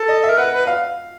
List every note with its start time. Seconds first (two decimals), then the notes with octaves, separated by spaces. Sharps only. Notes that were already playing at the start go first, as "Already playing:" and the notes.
Already playing: A4
0.08 D#5
0.24 E5
0.29 A#4
0.37 B4 F#5
0.53 B4
0.67 F5